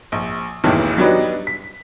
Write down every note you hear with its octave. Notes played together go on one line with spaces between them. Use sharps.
A#1
E1 B1 G2 A#2 D#3 E3
F#3 G3 B3 D4 D#4 B4
B6